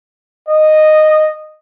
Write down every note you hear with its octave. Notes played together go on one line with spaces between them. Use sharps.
D#5